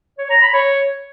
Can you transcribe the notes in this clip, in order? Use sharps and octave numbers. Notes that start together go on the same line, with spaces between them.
C#5
A#5
B5
C#5